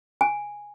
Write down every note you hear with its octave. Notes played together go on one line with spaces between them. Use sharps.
G#5